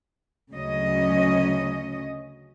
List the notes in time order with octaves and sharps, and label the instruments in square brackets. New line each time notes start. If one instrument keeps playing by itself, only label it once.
[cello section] D2 C#3 F#3 C#4 D#5